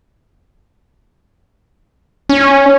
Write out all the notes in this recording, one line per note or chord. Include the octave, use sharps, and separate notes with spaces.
C#4